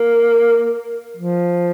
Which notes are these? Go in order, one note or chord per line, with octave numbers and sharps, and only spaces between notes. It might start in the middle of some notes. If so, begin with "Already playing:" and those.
Already playing: A#3
F3